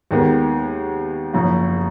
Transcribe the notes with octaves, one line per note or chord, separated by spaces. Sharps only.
D#2 D#3 G#3 B3
F#1 F#2 F3